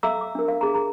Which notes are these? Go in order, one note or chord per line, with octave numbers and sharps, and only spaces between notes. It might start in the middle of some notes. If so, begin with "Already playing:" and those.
A4 E5 F5 A#5 D6 E6
D6
D4 A#4
F5
D4 G#4 A#5
G#4 A#5